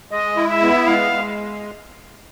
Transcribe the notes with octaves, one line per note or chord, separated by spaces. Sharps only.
G#3 D#5
E4
E5
B3
G#3 F5
G#3